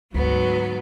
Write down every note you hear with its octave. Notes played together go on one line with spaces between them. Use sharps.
D2 G#2 F#3 B3